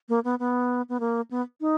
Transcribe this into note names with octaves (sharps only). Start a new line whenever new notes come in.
A#3
B3
B3
B3
A#3
B3
D#4